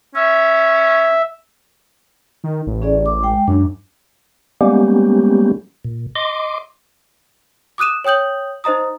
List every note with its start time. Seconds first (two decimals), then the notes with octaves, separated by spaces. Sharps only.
0.15 C#4 E5
2.44 D#3
2.67 A1
2.82 C#4 G#4 D5
3.06 D6
3.23 G#3 G5
3.48 F#2 D4
4.61 G3 G#3 A#3 B3 C#4 G4
5.85 A#2
6.15 D#5 C6 D6
7.78 D6 D#6 F#6 D#7 E7
8.04 C#5 G5 D#6 G6 F#7
8.64 D#4 C5 D#5 A#5 D#6